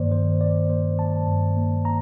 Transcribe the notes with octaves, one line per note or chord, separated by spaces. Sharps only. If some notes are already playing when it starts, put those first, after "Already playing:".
Already playing: G2 D#3 A#3 C5 D5
D#3 C5
D#3 D5
A#3 C5
D#3 A5
G2
A#3
A#3 A#5